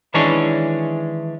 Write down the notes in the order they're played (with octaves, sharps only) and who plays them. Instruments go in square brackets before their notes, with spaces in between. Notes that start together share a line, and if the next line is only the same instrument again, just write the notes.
[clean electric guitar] D#3 E3 G#3 C#4 D4 C#5